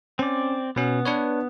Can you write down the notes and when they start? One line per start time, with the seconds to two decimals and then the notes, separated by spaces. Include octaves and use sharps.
0.19 C4 C#4 D5
0.76 B2 B3 C#4
1.05 D4 B4 C#5